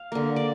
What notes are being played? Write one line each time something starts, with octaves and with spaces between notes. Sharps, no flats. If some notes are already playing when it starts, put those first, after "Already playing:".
Already playing: F5
D3 A#3
D5